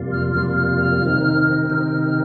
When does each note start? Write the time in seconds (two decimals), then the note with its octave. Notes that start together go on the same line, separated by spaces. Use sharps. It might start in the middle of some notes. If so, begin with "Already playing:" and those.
Already playing: F2 C3 G3 A#3 F4
0.12 F6
0.33 F2 C3 G3 A#3 F4 F6
0.55 F6
0.78 F6
1.02 C3 D#3 C4 D#4
1.70 C3 D#3 C4 D#4 F6